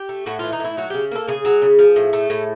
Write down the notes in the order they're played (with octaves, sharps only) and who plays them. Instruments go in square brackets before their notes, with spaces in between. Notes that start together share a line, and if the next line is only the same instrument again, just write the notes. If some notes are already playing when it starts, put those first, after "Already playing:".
Already playing: [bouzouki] G4
A3
A2 F#4
E3 F4
D#4
A2 E4
F#3 F#4
C#3 G4
A#3 A4
C#3 G#4
F#3
C#3
F3
A2
A3
A2